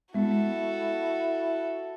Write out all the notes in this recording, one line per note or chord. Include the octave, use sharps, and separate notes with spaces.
G#3 B3 E4 F#4 A4